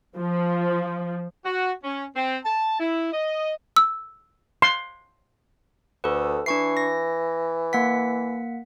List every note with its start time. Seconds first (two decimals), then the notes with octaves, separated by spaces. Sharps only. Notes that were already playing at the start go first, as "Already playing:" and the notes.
0.17 F3
1.45 F#4
1.84 C#4
2.16 C4
2.45 A5
2.80 E4
3.13 D#5
3.76 E6
4.62 C6
6.04 D2 A4 B4
6.46 E3 D4 C#6 C7
6.77 A#6
7.73 A#3 F#5 B6